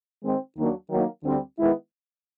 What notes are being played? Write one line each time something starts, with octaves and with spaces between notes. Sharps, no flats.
D#3 G#3 C4
D#2 D#3 F#3 A#3 D4
D#3 F#3 A#3 D#4
D2 D3 G3 C4
D#3 G#3 B3 E4